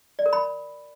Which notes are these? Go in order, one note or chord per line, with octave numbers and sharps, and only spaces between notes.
D5
A#4
B5